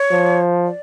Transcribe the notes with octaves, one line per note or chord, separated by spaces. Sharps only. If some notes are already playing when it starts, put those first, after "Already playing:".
Already playing: C#5
F3
D5